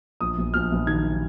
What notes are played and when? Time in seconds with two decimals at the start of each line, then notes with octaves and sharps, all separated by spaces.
0.21 A#1 D#6
0.38 A#1
0.54 A#1 F6
0.72 A#1
0.87 D#3 G#6